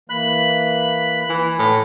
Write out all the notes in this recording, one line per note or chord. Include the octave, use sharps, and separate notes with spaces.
E3 A#3 B5 F#6
E3
A2